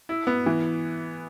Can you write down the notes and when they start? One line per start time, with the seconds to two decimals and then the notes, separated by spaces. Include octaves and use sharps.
0.09 E4
0.27 B3
0.46 E3